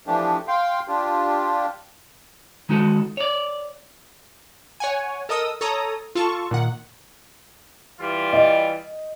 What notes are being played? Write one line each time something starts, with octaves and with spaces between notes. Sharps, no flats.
E3 F3 A3 D4 G4
F5 G5 C6
D4 F4 G4
D#3 G#3 D#4 F#4 A4
C#5 D5
C#5 F#5 G#5
A4 A#4 D#5 D#6 E6
A4 C#5 A#5 D#6
F4 A4 A5 C#6
A#2 D#3 F#5
E3 G3 F4
D#5